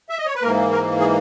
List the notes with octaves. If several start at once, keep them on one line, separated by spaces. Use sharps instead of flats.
E5
D#5
C#5
B4
G#2 E3 A#3 A#4
A#4
G#4